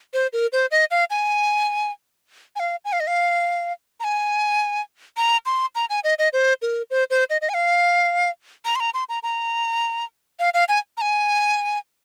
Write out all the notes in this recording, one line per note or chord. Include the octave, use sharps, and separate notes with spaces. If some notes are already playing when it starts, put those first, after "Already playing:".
C5
A#4
C5
D#5
F5
G#5
G#5
F5
G#5
F5
D#5
F5
A#5
G#5
A#5
C6
A#5
G#5
D#5
D#5
C5
A#4
C5
C5
D#5
D#5
G#5
F5
A#5
C6
A#5
C6
A#5
A#5
F5
F5
G#5
A#5
G#5